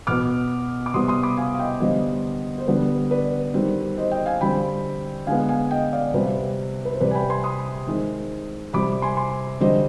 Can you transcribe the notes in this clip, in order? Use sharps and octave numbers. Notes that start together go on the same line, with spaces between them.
B2 B3 D6 F6
D6
C3 G3 B3 C6 D#6
C6 D#6
B5 D6
F5 G#5
F5
D#5 G5
D3 G3 B3 C5 D#5
C5
D3 G3 B3 B4
B4 D5
D#3 G3 C4
C5 D#5
D#5 G5
F5 G#5
D3 G3 C4 G5 B5
D3 G#3 B3 F5 G#5
F5 G#5
D#5 G5
D5 F5
C3 G3 C4 B4
B4
C5
C3 G3 C4 B4 D5
G#5
G5 B5
G#5 C6
C6 D#6
D#3 G#3 C4
C3 G3 C4 B5 D6
G#5 C6
G#5 C6
D3 G3 C4 C5 D#5